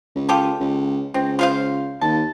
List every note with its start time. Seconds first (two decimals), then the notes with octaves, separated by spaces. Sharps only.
0.15 C#2
0.29 F4 G4 A4
0.60 C#2
1.14 C#2 C4
1.39 F4 C5 F5
2.01 D#2 A5